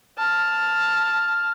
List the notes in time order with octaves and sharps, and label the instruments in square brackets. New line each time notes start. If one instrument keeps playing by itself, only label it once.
[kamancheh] A5 F6